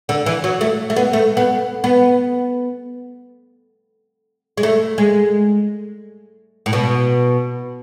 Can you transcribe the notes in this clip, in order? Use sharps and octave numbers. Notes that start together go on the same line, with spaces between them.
D3
E3
F#3
A3
A3
B3
A3
B3
B3
G#3
A3
G#3
A2
B2